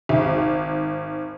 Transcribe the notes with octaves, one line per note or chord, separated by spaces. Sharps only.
G#1